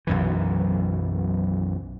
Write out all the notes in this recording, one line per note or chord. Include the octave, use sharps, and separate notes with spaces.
B1 F#2 E3